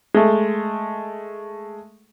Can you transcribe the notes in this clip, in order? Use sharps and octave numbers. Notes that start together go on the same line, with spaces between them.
G#3 A3